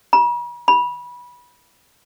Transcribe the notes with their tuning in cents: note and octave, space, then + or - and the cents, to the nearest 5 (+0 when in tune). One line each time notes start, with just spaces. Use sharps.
B5 -45
B5 -20